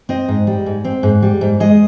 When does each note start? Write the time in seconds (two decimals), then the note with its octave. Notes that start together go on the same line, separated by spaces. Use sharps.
0.09 C4 D#5
0.28 G#2
0.47 G3
0.66 G#2
0.84 C4
1.03 G#2
1.22 G3
1.41 G#2
1.60 G#3 D#5